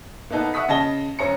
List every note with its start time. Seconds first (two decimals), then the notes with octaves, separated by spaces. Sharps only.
0.30 A#3 B3 D#4 A4 B4
0.54 E5 F#5 C#6 D#6 B6
0.68 C#3 D#5 A5 A#6 G7
1.19 E1 C#4 A#5 C#7